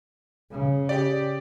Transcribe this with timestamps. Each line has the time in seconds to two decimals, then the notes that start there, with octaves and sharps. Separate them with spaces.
0.51 C#3
0.89 G4 D5